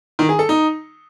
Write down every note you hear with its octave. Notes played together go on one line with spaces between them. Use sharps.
D#3
G#4
A4
D#4